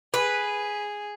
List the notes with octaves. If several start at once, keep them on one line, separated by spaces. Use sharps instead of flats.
G#4 B4